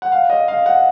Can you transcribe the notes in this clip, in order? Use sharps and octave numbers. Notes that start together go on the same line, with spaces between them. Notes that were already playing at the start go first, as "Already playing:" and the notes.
F#5
F5
D#5
F5
F#5